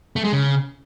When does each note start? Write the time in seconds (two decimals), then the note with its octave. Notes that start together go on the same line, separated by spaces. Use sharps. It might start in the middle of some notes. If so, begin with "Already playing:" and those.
0.16 A3
0.24 G#3
0.33 C#3